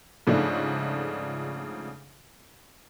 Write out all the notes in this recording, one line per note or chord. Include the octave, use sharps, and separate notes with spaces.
G#2 C#3 F3 A3 D4 D#4